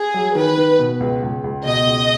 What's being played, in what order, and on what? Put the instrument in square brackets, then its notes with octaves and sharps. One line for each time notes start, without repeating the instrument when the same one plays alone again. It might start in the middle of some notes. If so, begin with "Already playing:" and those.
Already playing: [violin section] G#4
[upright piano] F#3
[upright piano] D#3 [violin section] B4
[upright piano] D#3
B2
C#2
C#2
C#2
[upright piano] B2 [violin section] D#5
[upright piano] C#2